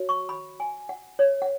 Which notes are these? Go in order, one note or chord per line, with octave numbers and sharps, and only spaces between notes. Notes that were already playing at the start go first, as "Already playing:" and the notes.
Already playing: F#4 C#5
C#6
B5
G#5
F#5
C#5
F#5